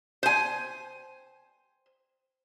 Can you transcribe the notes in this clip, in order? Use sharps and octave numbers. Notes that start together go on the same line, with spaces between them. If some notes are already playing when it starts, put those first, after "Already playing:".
C5 G#5